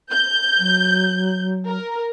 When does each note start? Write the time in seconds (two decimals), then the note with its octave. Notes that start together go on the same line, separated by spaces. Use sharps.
0.11 G6
0.59 F#3
1.67 A#4